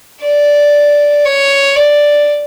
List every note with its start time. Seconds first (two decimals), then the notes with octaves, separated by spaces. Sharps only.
0.22 D5
1.25 C#5
1.76 D5